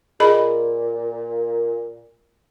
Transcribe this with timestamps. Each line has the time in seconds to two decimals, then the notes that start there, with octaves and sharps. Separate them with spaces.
0.20 A#2 G#4 D#5 B5